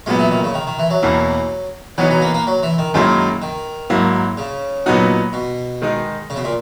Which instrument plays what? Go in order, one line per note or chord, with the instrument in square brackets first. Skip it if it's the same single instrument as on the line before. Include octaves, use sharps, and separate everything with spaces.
[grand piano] A#2 F#3 B3 [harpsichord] G#3
[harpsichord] E3
D#3
C#3
D#3
D#3
E3
F#3
[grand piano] E2 B2 A#3 E4
[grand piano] E3 B3 D#4 F#4 [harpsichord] F#3
[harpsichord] F#3
A#3
A#3
F#3
E3
D#3
[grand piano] F#2 D#3 F#3 A#3 E4 [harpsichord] G#3
[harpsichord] D#3
[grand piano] G#2 F#3 A#3 E4
[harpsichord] C#3
[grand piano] A#2 F#3 B3 D#4 F#4
[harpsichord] B2
[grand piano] D#3 G#3 D#4
[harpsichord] C#3
B2
A#2